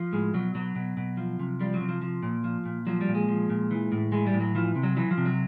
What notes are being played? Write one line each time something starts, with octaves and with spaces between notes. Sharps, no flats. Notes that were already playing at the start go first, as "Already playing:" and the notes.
Already playing: F3
A2 G#3
B2 F#3
B2 F#3
B2
B2
F3
C3
F3 G3
F#3
C3
F3
F3
A#2
F3
A#2
F3 F#3
G3
A#2
G#3
F3
A#2
E3
A2
E3 G#3
G3
A2
F#3
E3 F3
C3
F#3
E3 F#3
F3
C3
F#3